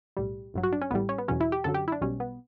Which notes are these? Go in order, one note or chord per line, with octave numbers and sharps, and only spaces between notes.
B1 A2 G3
A1 G2 F#3
F#4
D4
C#4
A1 A2 G3 B3
C#4
B3
E2 B2 F#3 C#4
E4
G4
F#2 D3 F#3 A4
G4
E4
D4
B1 B2 G3 C#4
B3